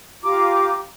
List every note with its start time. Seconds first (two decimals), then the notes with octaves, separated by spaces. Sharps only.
0.23 F4 G4 A#5 D6